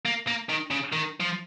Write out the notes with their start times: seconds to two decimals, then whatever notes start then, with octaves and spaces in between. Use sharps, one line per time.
0.05 A#3
0.27 A#3
0.49 D#3
0.70 C#3
0.92 D#3
1.20 F3